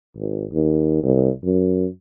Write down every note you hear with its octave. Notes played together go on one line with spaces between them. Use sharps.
G#1
D#2
C2
F#2